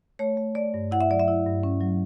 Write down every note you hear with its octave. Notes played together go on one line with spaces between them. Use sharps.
A3 C#5
A3
A3 D5
G2
E4 F#5
E5
F#3 D5
E5
E4
G2
C#4
F#3